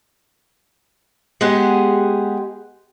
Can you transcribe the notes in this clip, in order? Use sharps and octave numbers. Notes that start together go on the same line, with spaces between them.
G#3 B3 G4 G#4 F#5